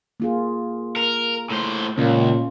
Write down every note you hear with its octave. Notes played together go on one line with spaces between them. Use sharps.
A#3 F4 G#4
A#4
A2 C5
C#2 A#2 C#4 F4